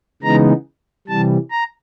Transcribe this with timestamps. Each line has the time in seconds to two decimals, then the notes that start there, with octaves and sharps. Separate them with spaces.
0.22 C#3 E3 G#3 B3 D#4 A#5
1.08 C3 E3 G3 A5
1.51 A#5